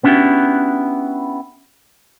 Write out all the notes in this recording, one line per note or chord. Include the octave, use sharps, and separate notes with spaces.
B3 C#4 D4 E4 F#4 G4